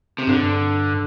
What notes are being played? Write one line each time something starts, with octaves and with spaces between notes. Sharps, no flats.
C3
G2 D3